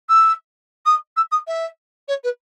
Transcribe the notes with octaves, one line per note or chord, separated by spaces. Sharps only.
E6
D#6
E6
D#6
E5
C#5
B4